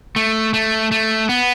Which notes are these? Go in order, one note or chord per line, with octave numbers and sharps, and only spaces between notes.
A3
A3
A3
B3